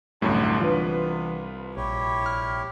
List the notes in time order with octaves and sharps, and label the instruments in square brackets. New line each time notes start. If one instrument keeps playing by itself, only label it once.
[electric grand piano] G1 F#2 A2 [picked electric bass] C2 G3 [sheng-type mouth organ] A5
[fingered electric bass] E3 D4 [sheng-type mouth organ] B3 [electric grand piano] F4 B4
[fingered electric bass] A#1 [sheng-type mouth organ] E4 G4 C#5
[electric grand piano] F6